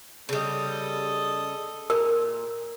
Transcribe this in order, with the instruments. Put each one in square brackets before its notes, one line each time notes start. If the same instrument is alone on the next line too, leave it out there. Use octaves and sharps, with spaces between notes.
[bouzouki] C#3 G3 [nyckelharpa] A4 D#5
[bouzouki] A#2 [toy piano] A#4